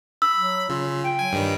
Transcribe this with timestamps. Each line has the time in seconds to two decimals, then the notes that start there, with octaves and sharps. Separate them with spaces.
0.22 B5 E6
0.37 F#3
0.69 C#3 F4
1.04 G5
1.19 F#3 G#5
1.33 G2 D#3 G3